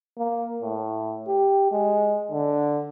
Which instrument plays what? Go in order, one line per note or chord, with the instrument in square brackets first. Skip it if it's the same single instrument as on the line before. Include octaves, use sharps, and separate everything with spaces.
[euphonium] A#3
A2
G4
G#3
D3